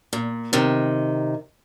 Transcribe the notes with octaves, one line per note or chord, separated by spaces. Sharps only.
A#2
C3 D#3